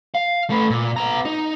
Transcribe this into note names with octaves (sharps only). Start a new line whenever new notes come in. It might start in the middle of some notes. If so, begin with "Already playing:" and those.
F5
A3 B4
A#2
B3 A#5
D#4